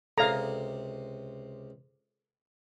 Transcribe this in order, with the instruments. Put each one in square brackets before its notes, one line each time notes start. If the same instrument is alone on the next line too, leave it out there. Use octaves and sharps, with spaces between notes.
[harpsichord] C#2 C3 [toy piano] A4 D5 E5 [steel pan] F5 A#5